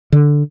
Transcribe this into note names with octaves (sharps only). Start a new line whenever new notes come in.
D3